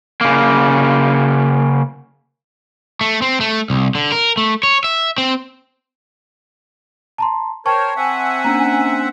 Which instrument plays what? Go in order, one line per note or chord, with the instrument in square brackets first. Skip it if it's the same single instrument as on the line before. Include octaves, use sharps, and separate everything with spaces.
[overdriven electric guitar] C#3 A#3
A3
C4
A3
C2
D3
A#4
A3
C#5
E5
C4
[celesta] A5 A#5 C6
[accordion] A#4 C5 C#5 [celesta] G5 A5 C#6
[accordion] C4 E5 F#5 [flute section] G#5
[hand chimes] A#3 C#4 D4 [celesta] A#5